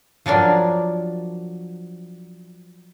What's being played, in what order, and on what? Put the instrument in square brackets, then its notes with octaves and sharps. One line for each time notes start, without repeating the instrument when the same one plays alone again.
[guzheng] F3 F#3 D4 A#4